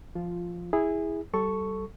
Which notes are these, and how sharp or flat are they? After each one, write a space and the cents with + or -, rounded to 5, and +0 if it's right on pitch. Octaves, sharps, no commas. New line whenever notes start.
F3 -10 F4 +0
E4 -10 G#4 -15
G3 -30 A4 +0 C#6 +0